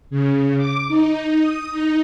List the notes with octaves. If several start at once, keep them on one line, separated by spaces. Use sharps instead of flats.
C#3
D6
D#4
D#6
D#4